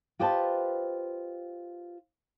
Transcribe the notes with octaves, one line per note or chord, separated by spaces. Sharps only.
F4 G4 B4 C5 D#5 A5